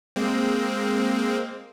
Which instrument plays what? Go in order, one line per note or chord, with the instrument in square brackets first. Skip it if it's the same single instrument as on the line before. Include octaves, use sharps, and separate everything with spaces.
[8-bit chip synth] G#3 A#3 C4